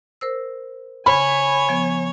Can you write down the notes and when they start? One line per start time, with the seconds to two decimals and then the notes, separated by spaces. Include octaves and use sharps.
0.21 A#4 C5 E6
1.06 C#3 C#5 G#5 B5
1.69 F3 B3